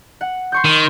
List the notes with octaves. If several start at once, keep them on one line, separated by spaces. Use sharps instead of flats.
F#5
C6 C#6 G6
D#3